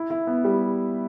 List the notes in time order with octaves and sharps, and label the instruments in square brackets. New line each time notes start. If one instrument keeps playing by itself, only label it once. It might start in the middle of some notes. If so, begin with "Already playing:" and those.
Already playing: [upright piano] E4
E4
B3
G3